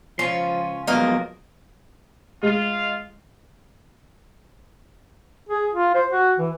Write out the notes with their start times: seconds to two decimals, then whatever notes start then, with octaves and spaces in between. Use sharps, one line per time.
0.19 C#2 F3 C#4 F4 C6
0.87 F3 F#3 G#3 A#3 B3 A#4 D#5
2.43 G#3 F4
5.49 G#4
5.73 F4
5.95 C5
6.11 F#4
6.38 E3